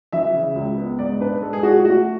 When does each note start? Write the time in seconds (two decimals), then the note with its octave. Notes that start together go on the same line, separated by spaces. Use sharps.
0.12 E3 E5
0.35 C#3
0.56 C#2
0.78 B3
0.99 G#2 D5
1.20 D4 B4
1.43 G#3 A4
1.53 G#4
1.63 G#3 F#4
1.74 F#4
1.85 A3 F#4